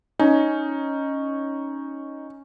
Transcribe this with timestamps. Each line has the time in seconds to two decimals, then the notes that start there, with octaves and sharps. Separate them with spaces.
0.19 C#4 D#4